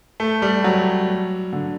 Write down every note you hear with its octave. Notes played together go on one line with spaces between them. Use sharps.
A3
G3
F#3
D3